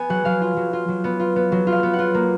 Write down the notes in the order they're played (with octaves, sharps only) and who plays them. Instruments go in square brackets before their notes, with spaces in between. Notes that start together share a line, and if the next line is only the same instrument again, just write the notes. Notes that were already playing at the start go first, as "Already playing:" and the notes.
Already playing: [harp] B3 G#5
F#3 F#5
F#3 F5
F4
F#3
F4
F#3
B3
F4
B3
F#3
F4
F5
B3
F#5
F4
A#3